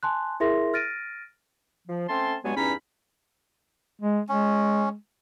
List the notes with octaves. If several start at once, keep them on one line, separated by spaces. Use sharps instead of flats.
G#5 A5 C6 F#6
E4 G#4 A#4 E5 C6 A#6
F6 A6 A#6 D7 D#7
F3
A3 C4 C#4 A5 C6
G2 F#3 G#3 B3 C#5 G#5
E2 G2 C#4 D#4 A#5 B5
G#3
G#3 C#4